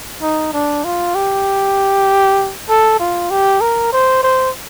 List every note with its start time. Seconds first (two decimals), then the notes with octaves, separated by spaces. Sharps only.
0.22 D#4
0.53 D4
0.84 F4
1.15 G4
2.69 A4
2.99 F4
3.30 G4
3.61 A#4
3.93 C5
4.23 C5